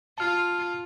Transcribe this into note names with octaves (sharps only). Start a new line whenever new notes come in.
F4 A5 F6